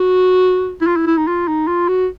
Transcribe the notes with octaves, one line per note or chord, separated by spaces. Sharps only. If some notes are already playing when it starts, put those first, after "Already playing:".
Already playing: F#4
E4
F4
E4
E4
D#4
F4
D#4
F4
F#4